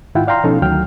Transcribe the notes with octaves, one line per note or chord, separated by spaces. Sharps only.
G#2 D#3 E4 F4 F#5 G5
D5 F5 G5 A#5 C6 F6
B2 F3 C#4 D#4 A4
D2 D#3 F#3 G5 F6